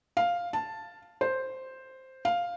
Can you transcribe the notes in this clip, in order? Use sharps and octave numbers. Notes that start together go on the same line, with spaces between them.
F5
A5
C5
F5